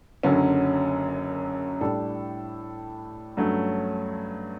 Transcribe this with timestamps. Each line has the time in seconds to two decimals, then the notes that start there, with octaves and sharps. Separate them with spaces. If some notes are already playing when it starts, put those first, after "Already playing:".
0.23 F#1 F#2 D3 F#3 C#4
1.81 A2 G3 D4 A4
3.37 G2 F#3 A3 C#4